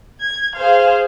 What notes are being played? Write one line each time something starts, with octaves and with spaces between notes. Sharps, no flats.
G#6
G#4 C5 F5